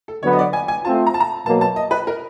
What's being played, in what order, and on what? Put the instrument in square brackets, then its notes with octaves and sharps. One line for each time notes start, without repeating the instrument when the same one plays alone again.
[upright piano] A4
[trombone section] D3 F#3 B3 [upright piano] C#5
[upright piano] D#5
D5
G#5
G#5
[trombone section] A3 C4 F4 [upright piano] A5
[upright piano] A#5
A5
A#5
[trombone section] B2 F#3 A#3 [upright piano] A5
[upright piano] A5
D#5
B4
A#4